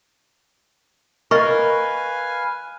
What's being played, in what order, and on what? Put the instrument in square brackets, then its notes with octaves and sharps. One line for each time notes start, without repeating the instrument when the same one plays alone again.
[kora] A#4 [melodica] B4 F5 G#5 [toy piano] D#5 B5 C#6